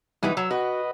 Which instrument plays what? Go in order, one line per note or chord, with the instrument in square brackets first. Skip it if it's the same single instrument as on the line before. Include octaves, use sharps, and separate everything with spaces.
[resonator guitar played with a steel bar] E3 D#4 B4 [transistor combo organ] G3 E4 F#5
[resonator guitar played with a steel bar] F#3 [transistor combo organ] E6
[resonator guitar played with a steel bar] F#4 [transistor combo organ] B4 D#5